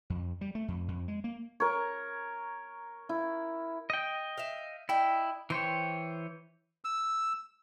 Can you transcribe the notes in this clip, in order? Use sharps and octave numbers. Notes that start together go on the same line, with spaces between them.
F2
G3
A3
F2
F2
G#3
A#3
A#4 C#5
E4
D#5 G5
E5 F5
E4 D5 D#5 G5
E3 C5 C#5 G5
E6